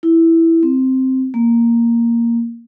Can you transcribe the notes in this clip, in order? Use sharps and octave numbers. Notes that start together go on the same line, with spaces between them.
E4
C4
A#3